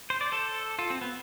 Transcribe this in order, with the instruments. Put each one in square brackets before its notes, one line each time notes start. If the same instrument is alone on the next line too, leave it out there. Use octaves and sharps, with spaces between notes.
[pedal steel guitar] C5
D5
A4 C5
F4 A4
C4
B3